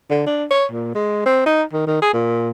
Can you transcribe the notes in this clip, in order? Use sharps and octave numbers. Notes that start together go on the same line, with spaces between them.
D3
D4
C#5
A#2
G#3
C4
D#4
D#3
D#3
G#4
A#2